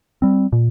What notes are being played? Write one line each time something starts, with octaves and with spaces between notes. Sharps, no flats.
G3 C4
A#2